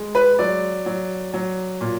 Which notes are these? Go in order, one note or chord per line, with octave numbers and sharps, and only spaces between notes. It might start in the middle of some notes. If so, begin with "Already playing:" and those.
Already playing: G#3
B4
F#3 D5
F#3
F#3
A#2